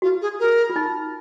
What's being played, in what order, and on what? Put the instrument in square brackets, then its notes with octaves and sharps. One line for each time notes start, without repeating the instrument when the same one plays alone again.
[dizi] F4 [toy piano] F#4
[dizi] G#4
A#4
[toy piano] F4
D#4